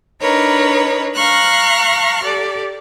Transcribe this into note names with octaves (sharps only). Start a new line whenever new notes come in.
D4 D#4 A#4 B4 C#5
F5 A#5 C#6 F6 F#6
G4 A4 D5